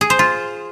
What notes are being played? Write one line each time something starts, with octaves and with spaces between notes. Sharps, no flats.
G#4
C5
F4